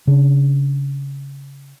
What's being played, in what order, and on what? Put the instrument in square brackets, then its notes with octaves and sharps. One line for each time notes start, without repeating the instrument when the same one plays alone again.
[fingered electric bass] C#3 D4